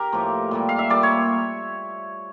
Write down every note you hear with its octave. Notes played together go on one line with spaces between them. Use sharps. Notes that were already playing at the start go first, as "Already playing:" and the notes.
Already playing: G4 A#4
A2 F3 A#3
A#2 G3 A#3
F5
E5
A#2 G3 A#3 D5
C#5